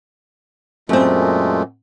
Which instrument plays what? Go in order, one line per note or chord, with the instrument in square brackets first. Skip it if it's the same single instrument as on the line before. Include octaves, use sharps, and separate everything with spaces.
[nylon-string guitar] F#2 C4 [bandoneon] A#2 G#3 A3